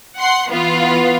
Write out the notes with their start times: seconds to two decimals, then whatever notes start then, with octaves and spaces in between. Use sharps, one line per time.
0.16 F#5 C6
0.48 E3 B3 F4